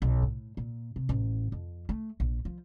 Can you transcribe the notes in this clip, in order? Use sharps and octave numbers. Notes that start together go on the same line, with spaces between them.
B1
A2
A#2
C3
A1
F2
A3
A#1
F3